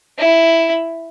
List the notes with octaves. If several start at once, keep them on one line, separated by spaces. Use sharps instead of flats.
E4